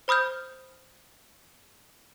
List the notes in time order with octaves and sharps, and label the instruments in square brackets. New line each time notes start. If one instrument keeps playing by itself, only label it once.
[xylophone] C5 B5 D#6 F6 G6